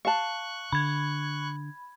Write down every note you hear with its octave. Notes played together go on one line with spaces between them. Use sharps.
F5 A5 C#6 F#6
D3 B5 G#6